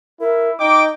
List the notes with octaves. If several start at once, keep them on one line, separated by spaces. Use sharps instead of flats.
E4 A#4
D#4 D#5 G5 D6